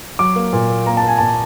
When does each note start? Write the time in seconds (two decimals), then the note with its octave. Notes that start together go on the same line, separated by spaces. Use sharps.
0.19 F#3 D6
0.36 A#3
0.53 A#2
0.70 A#3
0.87 A#3 A#5
0.97 A5
1.03 A#3 G#5
1.18 A#2 A5